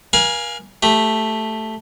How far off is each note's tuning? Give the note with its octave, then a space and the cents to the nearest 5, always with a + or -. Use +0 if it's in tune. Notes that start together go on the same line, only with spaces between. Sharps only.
A#4 +45 F5 +0 G#5 +0
A3 +0 G4 +10